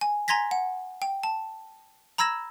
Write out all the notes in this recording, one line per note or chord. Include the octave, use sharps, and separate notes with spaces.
G#5
G#5 A#5 C6 G#6 A#6 B6
F#5
G5
A5
A#5 B5 E6 G#6 A#6 E7